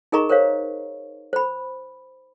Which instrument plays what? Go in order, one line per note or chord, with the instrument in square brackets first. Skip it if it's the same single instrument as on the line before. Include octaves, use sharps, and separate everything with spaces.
[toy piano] D#4 G#4 A#4 D#5 A#5 C#6
A#4 C5 C#5 F5
C5 B5